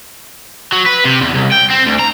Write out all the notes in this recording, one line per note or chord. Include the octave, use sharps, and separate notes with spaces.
F#3
B4
C3
E2
C2
G5
C4
D2
A#5